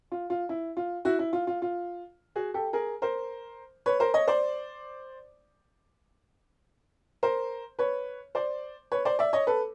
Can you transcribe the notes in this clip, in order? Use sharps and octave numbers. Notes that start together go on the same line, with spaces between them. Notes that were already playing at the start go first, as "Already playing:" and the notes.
F4
F4
E4
F4
E4 F#4
E4
F4
F4
F4
F#4 G#4
G4 A4
G#4 A#4
A#4 C5
B4 C#5
A#4 C5
C#5 D#5
C5 D5
A#4 C5
B4 C#5
C5 D5
B4 C#5
C5 D5
D5 E5
C#5 D#5
A4 B4